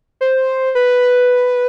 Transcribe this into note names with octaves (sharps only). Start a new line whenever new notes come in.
C5
B4